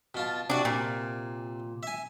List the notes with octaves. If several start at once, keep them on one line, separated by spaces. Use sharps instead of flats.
B2 F4 A5
C3 D4 F#4
A#2
E5 G#5